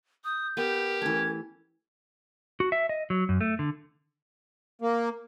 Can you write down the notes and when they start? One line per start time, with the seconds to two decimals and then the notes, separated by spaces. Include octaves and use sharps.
0.24 D#6 G6
0.57 B3 G4 A#4
1.02 E3 A3 C#4 G#6
2.60 F#4
2.72 E5
2.89 D#5
3.10 F#3
3.29 F#2
3.41 A3
3.59 D3
4.82 A#3